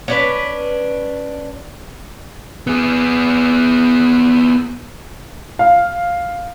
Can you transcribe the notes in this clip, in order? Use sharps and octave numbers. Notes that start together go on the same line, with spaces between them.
C#4 D4 B4
B3 G#4
F5